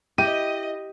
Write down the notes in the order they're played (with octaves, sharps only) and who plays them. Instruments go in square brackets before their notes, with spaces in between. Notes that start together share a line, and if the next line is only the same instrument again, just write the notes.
[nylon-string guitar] E4 [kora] G4 [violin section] D#5 [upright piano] D#7